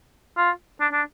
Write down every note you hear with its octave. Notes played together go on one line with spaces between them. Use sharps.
F4
D4
D4